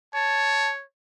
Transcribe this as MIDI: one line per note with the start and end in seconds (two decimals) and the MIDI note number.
0.14 0.83 73
0.14 0.71 81